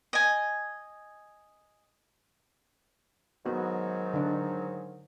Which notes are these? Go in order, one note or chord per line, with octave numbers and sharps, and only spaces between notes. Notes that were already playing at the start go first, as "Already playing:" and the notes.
D#5 G#5
G#2 D#3 F#3 B3 F#4
D3 D4